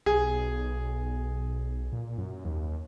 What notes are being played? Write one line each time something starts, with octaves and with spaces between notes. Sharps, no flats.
B1 G#4
A#2
F#2
D#2